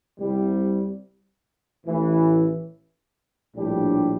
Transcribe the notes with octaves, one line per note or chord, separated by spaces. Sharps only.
C2 C3 G3
A1 A2 E3
A#1 A2 G3 D4 G4